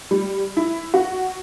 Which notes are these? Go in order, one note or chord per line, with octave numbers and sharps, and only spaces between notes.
G3
E4
F#4